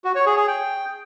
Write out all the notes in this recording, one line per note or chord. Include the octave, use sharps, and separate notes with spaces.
F#4
C#5
G#4
G#4
G5